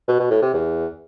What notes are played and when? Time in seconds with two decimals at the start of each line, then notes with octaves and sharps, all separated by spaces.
0.08 B2
0.20 B2
0.31 A2
0.42 C3
0.54 E2